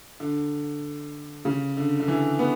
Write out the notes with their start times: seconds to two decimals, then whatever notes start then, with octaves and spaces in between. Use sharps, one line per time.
0.20 D3
1.45 C#3
1.77 D3
2.00 D3
2.08 E3
2.39 B3